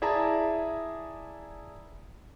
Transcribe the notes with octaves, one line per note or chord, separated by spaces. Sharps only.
E4 G#4 D5 E5 A5 A#5